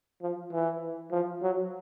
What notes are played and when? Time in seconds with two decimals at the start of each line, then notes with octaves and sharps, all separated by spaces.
0.22 F3
0.52 E3
1.11 F3
1.42 F#3